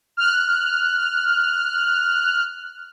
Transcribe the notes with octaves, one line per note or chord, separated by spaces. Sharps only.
F6 F#6